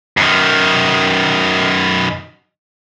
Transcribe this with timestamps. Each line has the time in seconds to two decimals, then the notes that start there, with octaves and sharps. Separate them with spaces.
0.17 F#2 D#3